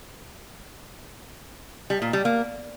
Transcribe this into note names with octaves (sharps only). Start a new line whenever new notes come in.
G3
A#2
G3
A#3